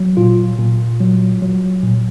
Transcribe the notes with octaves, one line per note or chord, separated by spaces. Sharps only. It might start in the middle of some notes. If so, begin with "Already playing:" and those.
Already playing: F#3
A#2 F4
A#2
F#3
F#3
A#2